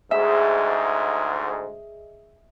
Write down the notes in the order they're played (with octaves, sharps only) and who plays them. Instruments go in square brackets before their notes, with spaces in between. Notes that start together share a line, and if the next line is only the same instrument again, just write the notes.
[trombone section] D2 G#2 [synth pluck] G#4 D#5 [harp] E5